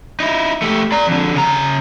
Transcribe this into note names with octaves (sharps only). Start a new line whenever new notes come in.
D#4 E4
A3 G4
D5 A#5
F2 D3
C#3 A#5